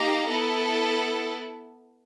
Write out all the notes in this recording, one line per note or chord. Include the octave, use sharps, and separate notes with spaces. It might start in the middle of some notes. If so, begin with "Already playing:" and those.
Already playing: A#3 D#4 G4 A#5
B3 E4 A4